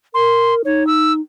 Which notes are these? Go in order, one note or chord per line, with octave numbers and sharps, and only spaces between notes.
A#4 C6
D#4 C#5
E6